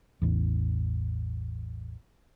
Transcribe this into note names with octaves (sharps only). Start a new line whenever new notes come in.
A1 E2